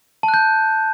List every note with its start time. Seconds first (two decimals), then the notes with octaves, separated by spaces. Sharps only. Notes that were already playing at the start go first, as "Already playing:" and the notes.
0.23 A5
0.28 F#6
0.34 G6